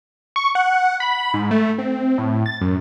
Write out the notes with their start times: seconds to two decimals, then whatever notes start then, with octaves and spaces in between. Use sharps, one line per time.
0.36 C#6
0.55 F#5
1.00 B5
1.34 G#2
1.51 A3
1.79 C4
2.18 A2
2.46 A6
2.61 F#2